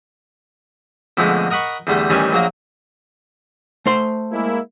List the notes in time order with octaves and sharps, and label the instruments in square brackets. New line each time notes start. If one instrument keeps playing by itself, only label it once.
[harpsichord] F2 B2 D3 G#3 A3
A#4 D#5 F#5 B5 C#6
E2 D3 G3 A3
A1 D#3 E3 G3 C#4 G#5
A#1 F#3 A#3 A#5
[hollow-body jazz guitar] A3 C5 C6
[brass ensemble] G#3 A#3 E4